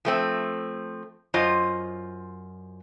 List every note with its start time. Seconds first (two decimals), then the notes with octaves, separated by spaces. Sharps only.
0.05 F3 A3 C4
1.34 F#2 F4 C5 D#5